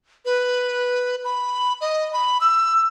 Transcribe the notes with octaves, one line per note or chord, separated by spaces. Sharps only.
B4
B5
D#5
B5
E6